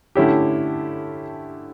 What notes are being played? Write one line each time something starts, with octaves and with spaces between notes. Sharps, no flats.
D3 A3 C#4 E4 G4